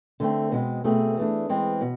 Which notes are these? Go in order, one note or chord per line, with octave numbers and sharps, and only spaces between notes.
D3 A3 C4
B2 G#3 C4
B2 A3 C4 G#4
E3 A3 D4
E3 G#3 C4
B2